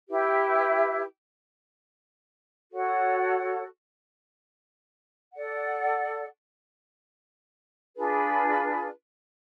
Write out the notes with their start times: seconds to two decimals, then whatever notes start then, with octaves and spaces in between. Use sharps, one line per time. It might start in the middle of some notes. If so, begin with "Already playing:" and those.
0.09 E4 G4 B4 E5
2.71 F#4 A4 C#5 F#5
5.34 A4 D5 F#5
7.96 D4 F4 G#4 B4